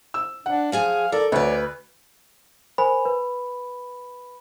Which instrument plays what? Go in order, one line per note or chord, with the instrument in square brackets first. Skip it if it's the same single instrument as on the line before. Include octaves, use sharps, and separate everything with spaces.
[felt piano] E6
[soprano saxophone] D4 [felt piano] F#5
[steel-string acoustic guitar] F3 G#4 G#5 [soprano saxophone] F5
[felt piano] A4 [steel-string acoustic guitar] A#4 [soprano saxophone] D5
[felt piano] D2 [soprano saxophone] B4 [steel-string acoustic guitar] C#5 D5
[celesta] A#4 C5 G#5 [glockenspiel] B5
[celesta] B4